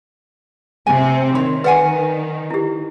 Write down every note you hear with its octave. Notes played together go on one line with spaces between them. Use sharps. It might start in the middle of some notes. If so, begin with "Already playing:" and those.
C3 C4 G#5
D#3 C#5 C6
B4 D5 F#5 G#5
E4 G4